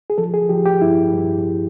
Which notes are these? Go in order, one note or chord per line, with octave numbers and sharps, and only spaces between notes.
G#4
F3 A4
G#4
F3 G4
G4
G2 E4
G2